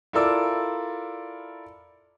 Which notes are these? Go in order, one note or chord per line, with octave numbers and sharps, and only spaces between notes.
E4 F4 A4 A#4 D5 E6